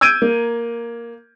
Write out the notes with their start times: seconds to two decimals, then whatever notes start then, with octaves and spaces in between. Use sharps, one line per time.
0.01 E6 G6 G#6 D7 D#7
0.22 A#3